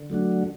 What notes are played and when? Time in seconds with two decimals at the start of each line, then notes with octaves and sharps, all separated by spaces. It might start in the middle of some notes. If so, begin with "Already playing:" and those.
Already playing: D3
0.10 F#3 A3 D4 F#4